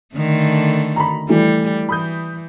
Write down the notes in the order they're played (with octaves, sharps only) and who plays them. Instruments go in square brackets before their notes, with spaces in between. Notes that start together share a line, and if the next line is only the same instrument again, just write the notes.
[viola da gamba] D3 D#3 A3
[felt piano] A#5 B5
[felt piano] E3 A3 [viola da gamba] G3
[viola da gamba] E3 [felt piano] B5 D#6 G6